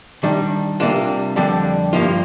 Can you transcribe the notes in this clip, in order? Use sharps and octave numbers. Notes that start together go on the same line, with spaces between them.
D#3 G3 D4
C3 G3 A#3 D4 F4
F2 D3 G3 D4
G2 F3 A#3 F4